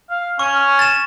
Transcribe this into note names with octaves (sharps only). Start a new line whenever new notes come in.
F5
C#4 C#6
A6 E7